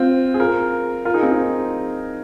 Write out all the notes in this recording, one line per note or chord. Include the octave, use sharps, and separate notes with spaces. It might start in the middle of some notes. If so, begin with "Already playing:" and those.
Already playing: C4 F4
G#4
F4 A#4
F4 A#4
D#4 G#4
C4 F4
D#4 G#4